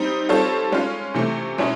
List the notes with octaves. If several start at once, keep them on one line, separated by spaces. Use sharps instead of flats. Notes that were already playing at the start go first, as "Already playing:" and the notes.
Already playing: G3 C4 D#4
G3 C4 F4 A4 C#5
G#3 C#4 F4
C3 E3 A3
B2 G#3 C#4 E4